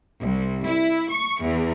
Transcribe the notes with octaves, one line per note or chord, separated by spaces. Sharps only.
C2
E4
C#6
E2